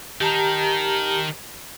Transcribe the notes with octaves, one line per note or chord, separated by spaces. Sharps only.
D#3 G4 A5 A#5